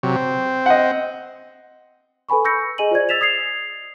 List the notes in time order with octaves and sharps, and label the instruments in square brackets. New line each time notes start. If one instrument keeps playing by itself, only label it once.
[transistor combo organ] C3 F#3
C4
[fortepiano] D#5 F#5
[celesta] A4 B4 G#5 B5 C#6
C#6 E6 G6 A#6 C#7
G#4 D#5 G#5 D#7 F#7
F4 C5 D5 G#6
E6 A6 B6 E7 F7
D#6 G#6 C7 F7